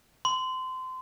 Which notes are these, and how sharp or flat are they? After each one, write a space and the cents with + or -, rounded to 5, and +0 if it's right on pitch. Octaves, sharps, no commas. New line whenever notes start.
C6 -25